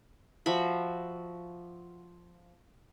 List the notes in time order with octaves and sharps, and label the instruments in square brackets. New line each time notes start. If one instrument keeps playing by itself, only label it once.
[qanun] F3 F#4 E5 B5